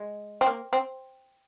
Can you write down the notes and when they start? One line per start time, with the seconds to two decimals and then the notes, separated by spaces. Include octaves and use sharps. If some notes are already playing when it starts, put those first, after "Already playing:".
Already playing: G#3
0.41 C4
0.46 A#3
0.73 C4